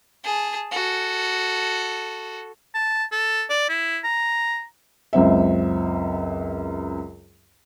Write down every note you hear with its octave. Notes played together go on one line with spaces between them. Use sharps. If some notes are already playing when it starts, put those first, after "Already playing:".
G#4 A5
F#4 A4
A5
A4
D5
E4
A#5
C#2 F#2 C4 E5